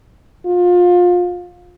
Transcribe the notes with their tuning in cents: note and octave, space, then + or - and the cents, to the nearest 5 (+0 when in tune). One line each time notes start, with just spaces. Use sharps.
F4 +25